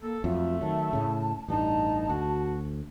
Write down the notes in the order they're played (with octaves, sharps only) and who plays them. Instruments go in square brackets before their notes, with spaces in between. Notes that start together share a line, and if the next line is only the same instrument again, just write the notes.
[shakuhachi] A#3 [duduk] A4
[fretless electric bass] F2 F#3 [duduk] A3 [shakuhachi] F4
[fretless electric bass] D#3 F#3 [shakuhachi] A5
[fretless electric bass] A2 C#3
[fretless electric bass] A1 G2 [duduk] D#4 [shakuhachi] A5
[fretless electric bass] D2 [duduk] F#4